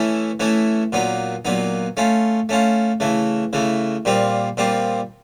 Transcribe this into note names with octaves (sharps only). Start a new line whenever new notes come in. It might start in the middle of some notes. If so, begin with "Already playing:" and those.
Already playing: E3 A3 C#4 E4
E3 A3 C#4 E4
A#2 F#3 B3 D#4
A#2 F#3 B3 D#4
A3 C#4 F4
A3 C#4 F4
C#3 E3 A3
C#3 E3 A3
A#2 G3 C4 F4
A#2 G3 C4 F4